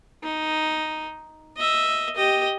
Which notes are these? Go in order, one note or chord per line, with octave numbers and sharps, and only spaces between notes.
D#4
D#5 E5
G4 D#5